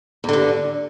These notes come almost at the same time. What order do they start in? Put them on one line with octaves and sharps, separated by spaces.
E2 D3 G2